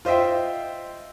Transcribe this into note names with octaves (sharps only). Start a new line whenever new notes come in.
F4 C5 D#5 E5 G5